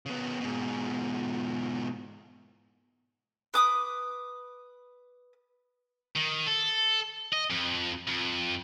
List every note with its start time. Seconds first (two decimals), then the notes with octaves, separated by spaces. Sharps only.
0.06 C#3 B3
0.41 G#2 B2
3.54 B4 D6 D#6
6.16 D#3
6.46 A4
7.33 D#5
7.50 F2
8.08 F2